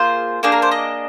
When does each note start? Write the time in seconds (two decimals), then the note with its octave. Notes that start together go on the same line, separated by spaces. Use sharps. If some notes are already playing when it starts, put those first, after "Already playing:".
Already playing: A#3 F4 G#4 C5
0.43 A#3 D4 G#4 C5
0.52 A#4
0.62 C5
0.71 D#5